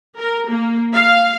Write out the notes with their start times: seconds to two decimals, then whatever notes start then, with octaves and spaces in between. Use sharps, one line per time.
0.18 A#4
0.51 A#3
0.94 F5